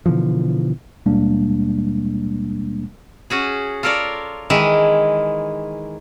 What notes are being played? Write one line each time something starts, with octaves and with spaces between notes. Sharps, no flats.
B2 D3 E3 F3
D#2 B2 G3 G#3 A#3 D4
C#4 F#4 G#4
F4 A4 A#4 C#5 D5
D#3 E3 G#3 E4